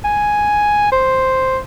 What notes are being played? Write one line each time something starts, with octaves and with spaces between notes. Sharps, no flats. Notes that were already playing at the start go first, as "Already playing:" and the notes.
G#5
C5